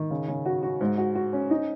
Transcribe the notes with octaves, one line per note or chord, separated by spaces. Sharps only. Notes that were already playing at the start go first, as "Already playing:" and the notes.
Already playing: D#3
C#3
C#3
F#4
F#4
G#2
F#4
F#4
C#4
D#4